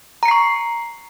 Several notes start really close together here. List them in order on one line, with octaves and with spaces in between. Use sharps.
A#5 C#7 C7 C#6